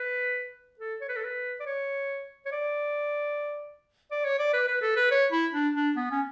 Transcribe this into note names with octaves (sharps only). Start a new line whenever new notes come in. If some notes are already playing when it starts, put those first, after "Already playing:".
Already playing: B4
A4
C#5
B4
A4
B4
D5
C#5
C#5
D5
D5
C#5
D5
B4
B4
A4
B4
C#5
E4
D4
D4
B3
C#4